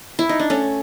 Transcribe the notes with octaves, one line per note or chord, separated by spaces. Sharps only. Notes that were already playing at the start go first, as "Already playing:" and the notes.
E4
D#4
D4
A3 C#4